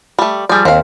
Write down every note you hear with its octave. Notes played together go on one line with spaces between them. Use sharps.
G3 A3
F3 G3 G#4 D5
D#2 C4 F5